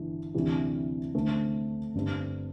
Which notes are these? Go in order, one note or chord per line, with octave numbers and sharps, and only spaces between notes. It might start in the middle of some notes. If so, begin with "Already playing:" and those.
Already playing: G1 G2 E3
D2 C3 E3 G3
D2 D3 A3 C4
G1 G2 G3 C4